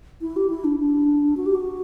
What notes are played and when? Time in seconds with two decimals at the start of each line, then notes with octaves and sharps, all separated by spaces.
0.21 E4
0.36 G4
0.50 E4
0.64 D4
0.80 D4
1.37 F#4
1.46 G4
1.55 F#4